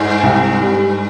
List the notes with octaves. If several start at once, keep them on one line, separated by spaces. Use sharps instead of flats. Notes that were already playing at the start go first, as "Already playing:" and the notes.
Already playing: G2
C2
G3